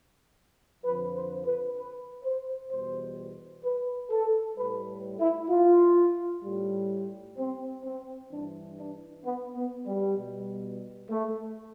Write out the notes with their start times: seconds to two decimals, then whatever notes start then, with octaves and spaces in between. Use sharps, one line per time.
0.83 F2 D3 F3 B4
1.14 C5
1.46 B4
1.77 B4
2.23 C5
2.70 E2 B2 G3 C5
3.63 B4
4.10 A4
4.57 A2 G3 B4
5.19 E4
5.50 F4
6.43 A2 G3
7.37 C4
7.84 C4
8.31 G2 E3 G3 D4
8.78 D4
9.24 B3
9.55 B3
9.87 G3
10.17 B2 G3
11.10 A3